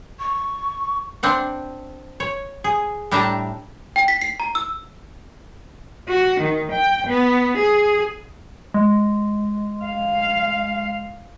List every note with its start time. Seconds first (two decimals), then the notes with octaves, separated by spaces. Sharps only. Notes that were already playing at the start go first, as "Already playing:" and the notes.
0.20 C#6
1.23 C4 D4 F#5
2.20 C#5
2.64 G#4
3.11 A2 G3 D4 E5 A5 A#5
3.96 G5
4.08 B6
4.22 C7
4.40 A#5
4.55 E6
6.08 F#4
6.41 D#3
6.72 G5
7.07 B3
7.58 G#4
8.74 G#3
9.85 F5